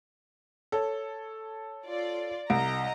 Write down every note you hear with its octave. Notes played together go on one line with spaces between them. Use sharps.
A4 C#5
F4 D5
C2 D#5 A#5 D7